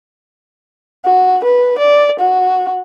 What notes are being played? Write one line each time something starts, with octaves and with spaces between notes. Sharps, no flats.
F#4
B4
D5
F#4